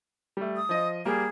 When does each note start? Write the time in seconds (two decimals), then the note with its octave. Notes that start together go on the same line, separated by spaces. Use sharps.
0.37 G3 A3
0.57 D#6
0.69 F3 D#5
1.05 G3 A#3 G#4